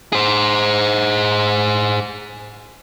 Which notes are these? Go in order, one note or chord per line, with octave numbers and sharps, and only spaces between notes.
G#4 C5